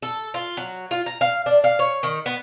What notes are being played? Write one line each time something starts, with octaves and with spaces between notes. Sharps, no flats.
A4
F4
F#3
F4
A#5
F5
D4
F5
C#5
D#3
B3